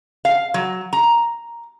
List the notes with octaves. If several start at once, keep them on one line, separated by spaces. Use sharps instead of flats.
F5
F#3
A#5